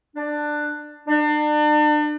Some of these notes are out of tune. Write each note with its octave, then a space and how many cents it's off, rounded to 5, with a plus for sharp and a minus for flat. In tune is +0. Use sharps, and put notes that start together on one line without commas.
D4 +15
D4 +35